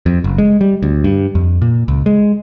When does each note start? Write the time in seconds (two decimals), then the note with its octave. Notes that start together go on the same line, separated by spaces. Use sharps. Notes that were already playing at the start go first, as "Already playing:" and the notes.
0.06 F2
0.24 F#1
0.38 G#3
0.61 G3
0.83 D2
1.04 G2
1.35 F2
1.62 A#2
1.88 C#2
2.06 G#3